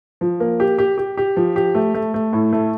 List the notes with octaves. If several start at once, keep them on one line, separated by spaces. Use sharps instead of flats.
F3
A#3
G4
G4
G4
G4
F3
G4
A3
A3
A3
A2
A3